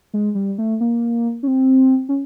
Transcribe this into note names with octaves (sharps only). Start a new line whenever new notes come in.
G#3
G3
A3
A#3
C#4
C4
C#4